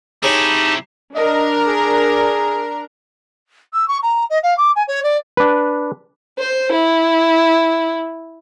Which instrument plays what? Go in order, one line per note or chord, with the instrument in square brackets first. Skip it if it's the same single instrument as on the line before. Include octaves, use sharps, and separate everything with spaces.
[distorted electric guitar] C4 E4 [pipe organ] D#4 G4 A5 [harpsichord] G#4 C#5 B5
[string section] D4 A#4 A#5 [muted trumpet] D#5
[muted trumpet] G#4
[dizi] E6
C#6
A#5
D#5
F5
D6
G#5
C#5
D5
[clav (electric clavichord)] D4 B4
[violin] C5
E4